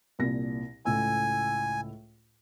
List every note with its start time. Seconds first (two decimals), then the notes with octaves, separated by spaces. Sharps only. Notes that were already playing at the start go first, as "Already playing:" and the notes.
0.19 C2 A#2 A#6
0.85 C#2 A2 G#5 E6